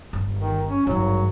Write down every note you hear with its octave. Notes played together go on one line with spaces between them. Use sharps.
G1
D#3
C#4
G#1 G2 F#3